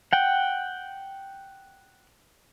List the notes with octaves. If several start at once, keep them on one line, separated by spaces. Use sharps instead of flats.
F#5 G5